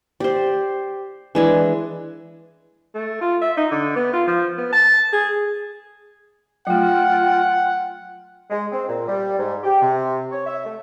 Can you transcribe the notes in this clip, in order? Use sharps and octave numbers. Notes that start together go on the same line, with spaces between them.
G4 C5 D5
E3 G#3 D4 B4 D5 G#5
A3
F4
E5
D#4
D3
B3
F4
F3
B3
A5
G#4
F#3 A3 F4 F#5 G5
G#3
C4
A#2
G3
G#2
G4
C3
C#5
E5
A3